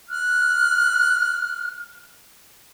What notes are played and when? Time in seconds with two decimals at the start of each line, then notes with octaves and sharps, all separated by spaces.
0.09 F6 F#6